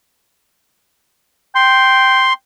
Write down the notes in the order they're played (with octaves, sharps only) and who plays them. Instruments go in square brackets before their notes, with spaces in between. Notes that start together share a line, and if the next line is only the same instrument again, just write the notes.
[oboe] G5 [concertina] C6